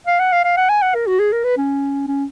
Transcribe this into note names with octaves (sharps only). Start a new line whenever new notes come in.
F5
F#5
F5
F5
F#5
G#5
F#5
A#4
F#4
G#4
A#4
B4
C#4
C#4